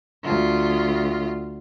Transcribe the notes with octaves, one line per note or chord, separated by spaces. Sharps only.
D2 F4